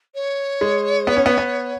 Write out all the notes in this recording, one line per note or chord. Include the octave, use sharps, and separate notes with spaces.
C#5
G#3
B3
C#4
B3
B3